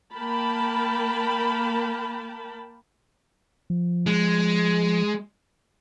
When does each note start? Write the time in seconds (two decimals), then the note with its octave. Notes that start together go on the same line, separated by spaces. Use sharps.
0.14 A#3 A#4 G5 A5 B5
3.70 F3
4.06 G#3